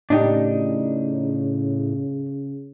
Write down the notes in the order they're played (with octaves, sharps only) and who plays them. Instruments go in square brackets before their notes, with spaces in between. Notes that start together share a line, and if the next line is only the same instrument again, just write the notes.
[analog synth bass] A2 [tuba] C#3 [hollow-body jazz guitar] D4 D#4 G4